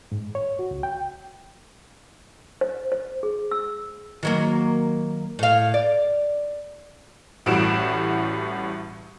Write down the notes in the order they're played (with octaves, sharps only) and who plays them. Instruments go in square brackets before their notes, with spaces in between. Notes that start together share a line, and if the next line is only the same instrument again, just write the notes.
[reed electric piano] G#2
C#5
F#4
C#2
G5
[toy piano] C5
C5
G#4
E6
[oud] D#3 F#3 A#3
A2 F5
D5
[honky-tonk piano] A1 A2 G3 F#4 D7 E7